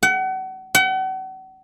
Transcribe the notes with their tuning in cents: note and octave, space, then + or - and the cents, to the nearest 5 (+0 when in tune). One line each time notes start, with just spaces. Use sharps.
F#5 +35
F#5 +40